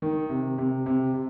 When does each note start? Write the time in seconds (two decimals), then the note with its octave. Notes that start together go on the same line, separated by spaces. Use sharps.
0.02 D#3
0.30 C3
0.58 C3
0.86 C3
1.14 C3